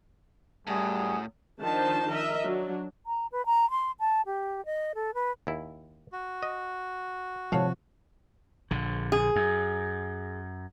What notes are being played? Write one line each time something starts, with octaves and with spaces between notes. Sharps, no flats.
F#2 A2 G3 F#4 G#4
D#3 F3 D4 D#4 C5 A5
A#4 D#5 E5
F#3 D4
A#5
B4
A#5
C6
A5
G4
D#5
A4
B4
D#2 E4
F#4
D#5
G#1 C3 F3 C#5 F5 F#5 A5
A#1 D3
G#4
F#2